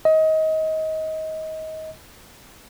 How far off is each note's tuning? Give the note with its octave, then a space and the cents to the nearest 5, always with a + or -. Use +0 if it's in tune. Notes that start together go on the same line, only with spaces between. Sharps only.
D#5 +25